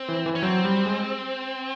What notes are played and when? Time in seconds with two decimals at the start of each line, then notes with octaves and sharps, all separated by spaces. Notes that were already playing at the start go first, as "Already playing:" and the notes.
Already playing: C4
0.09 E3
0.26 E3
0.35 C#4
0.43 F#3 C4
0.65 G3
0.86 G#3